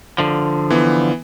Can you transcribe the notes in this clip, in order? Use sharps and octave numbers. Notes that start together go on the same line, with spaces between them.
D3 F3
E3 B3